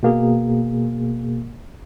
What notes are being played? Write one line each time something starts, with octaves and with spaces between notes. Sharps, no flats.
B2 A#3 G#4